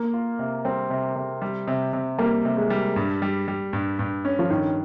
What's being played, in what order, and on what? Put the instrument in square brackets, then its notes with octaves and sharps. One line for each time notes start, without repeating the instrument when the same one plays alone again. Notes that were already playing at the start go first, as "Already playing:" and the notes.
Already playing: [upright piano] A#3
[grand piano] F4
C3
[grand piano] G3 [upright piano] C4
[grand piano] C3
C3
G3
C3
C3
[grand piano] G3 [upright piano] A#3
[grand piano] C3
[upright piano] G#3
[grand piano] G3
G2
G3
G3
G2
G2
C#4
[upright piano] F3
[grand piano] G2 [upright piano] D#3